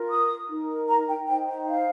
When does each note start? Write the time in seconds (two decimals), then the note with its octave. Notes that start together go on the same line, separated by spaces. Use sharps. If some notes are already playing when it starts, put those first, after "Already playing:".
Already playing: F4 A#4
0.09 D#6
0.48 D#4 A#4
0.89 A#5
1.08 G5
1.28 D#4 C5 G5
1.48 G5
1.68 F5